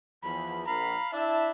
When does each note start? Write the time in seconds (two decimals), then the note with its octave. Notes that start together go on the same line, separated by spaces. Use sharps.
0.24 E2 F3 B5
0.68 A#1 F5 A#5 B5
1.13 D4 E4 E5 A5